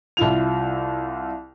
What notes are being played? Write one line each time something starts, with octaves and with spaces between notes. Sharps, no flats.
C2 E4 F4 F7